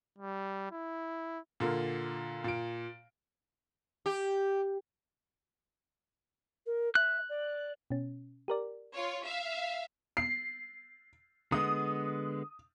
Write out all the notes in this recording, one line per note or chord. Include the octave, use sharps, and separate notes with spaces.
G3
E4
A#2 D3 A#3
A#2 D7
G4
A#4
E5 F#6
D5
B2 C#4
G4 A#4 D5
F4 C#5
E5 F5
C7
D3 G#3 B3 D#6